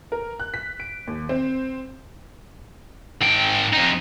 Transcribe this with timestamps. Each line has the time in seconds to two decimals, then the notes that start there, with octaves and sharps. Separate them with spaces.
0.12 A#4
0.40 F#6
0.54 B6
0.80 D7
1.07 D#2
1.29 C4
3.21 G#2 G5
3.73 F2 D#4